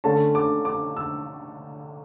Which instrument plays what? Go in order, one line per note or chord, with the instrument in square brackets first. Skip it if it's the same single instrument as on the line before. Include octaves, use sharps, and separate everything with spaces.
[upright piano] D3 A3 C#4 A5
D6
D6
E6